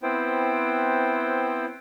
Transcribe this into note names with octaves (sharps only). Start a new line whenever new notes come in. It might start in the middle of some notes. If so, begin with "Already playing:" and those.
B3 C4 E4 C5 G5